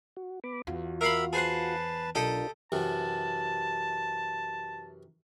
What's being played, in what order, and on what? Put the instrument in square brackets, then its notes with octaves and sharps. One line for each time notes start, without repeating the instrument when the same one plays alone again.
[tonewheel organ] F#4
B3 B5 D6
[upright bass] E2 [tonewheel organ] F4 F#4
[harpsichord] A#4 F5 B5 [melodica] E5 E6
[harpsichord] G#4 C5 F#5 [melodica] B4 A5
[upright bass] B1 [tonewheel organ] D4 F4 A#4 [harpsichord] G4 A4 D#5
[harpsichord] F#2 C3 E3 [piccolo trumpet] A5